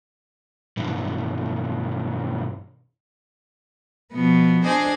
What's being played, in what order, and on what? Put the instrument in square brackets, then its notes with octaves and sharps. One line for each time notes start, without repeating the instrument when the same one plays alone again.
[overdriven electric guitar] B1 G2
[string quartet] B2 F3 B3
D4 G#4 C5 D5 D#5 G#5